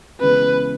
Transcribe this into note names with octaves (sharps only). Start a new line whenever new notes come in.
C#3 E3 G#3 B3 B4